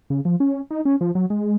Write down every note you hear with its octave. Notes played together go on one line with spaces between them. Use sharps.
C#3
F3
C#4
D#4
C#4
F3
F#3
G#3